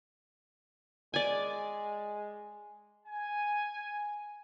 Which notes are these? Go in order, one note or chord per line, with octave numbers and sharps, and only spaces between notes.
G#3 D5 G#5
G#5